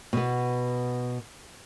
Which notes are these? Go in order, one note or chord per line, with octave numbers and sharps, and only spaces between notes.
B2 B3